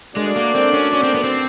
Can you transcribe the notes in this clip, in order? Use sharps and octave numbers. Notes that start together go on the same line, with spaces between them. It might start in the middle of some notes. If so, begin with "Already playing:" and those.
G#3 A3 D4 F#4 A#4 D5
A#3
C4
C#4
C#4
C4
B3
C4